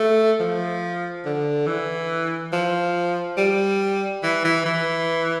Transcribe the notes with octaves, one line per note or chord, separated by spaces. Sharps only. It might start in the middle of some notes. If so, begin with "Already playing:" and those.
Already playing: A3
F3
D3
E3
F3
G3
E3
E3
E3